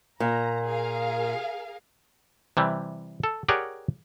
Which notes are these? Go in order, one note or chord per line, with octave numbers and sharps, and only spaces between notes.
A#2 A#5
G#4 A#4 F5
C3 E3 G3
A4
G4 G#4 A#4 C#5 D5 F#5